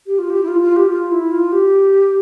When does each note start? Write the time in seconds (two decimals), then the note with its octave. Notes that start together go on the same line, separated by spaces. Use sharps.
0.06 G4
0.19 F4
0.30 G4
0.43 E4
0.48 F4
0.61 F4
0.76 G4
0.89 F4
1.11 E4
1.31 F4
1.52 G4